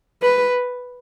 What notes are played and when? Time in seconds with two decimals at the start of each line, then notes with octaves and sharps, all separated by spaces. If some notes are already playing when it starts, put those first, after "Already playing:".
0.22 B4